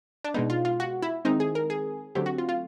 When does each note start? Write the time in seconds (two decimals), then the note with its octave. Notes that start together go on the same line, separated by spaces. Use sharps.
0.24 D4
0.34 B2 G#3 B3 D#4
0.50 F4
0.65 F4
0.80 F#4
1.02 E4
1.25 D#3 G#3 C4 D#4
1.40 G#4
1.55 A#4
1.70 G#4
2.15 D3 F#3 A3 C4 G4
2.26 F#4
2.38 F4
2.49 F4